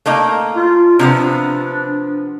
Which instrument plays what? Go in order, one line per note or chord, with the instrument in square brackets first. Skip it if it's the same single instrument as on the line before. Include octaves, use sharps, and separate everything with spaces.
[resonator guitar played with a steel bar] A3 A#3 D#4
[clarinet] F4
[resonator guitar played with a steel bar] C3 F3 B3 [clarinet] D4